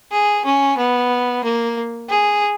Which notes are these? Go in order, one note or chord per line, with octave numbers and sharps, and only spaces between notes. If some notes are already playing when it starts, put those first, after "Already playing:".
G#4
C#4
B3
A#3
G#4